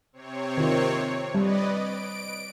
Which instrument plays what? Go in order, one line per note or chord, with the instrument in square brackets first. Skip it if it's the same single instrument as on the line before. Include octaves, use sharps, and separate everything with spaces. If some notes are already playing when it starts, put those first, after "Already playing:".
[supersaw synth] C3 C4 C#5
[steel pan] D#3 F4
[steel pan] G3 [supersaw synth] B4 D5 D#5
[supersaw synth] D7